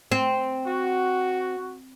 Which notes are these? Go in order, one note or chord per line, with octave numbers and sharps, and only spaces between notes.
C4
F#4